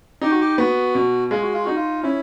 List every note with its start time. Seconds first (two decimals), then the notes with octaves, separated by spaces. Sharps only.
0.22 D#4 G4
0.31 F#4
0.41 G4
0.58 B3 F#4
0.95 B2
1.31 G#3 F4
1.42 F#4
1.53 F4
1.64 D#4 F#4
1.76 F4
2.03 C#4 E4